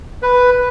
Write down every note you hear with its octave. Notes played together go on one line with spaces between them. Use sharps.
B4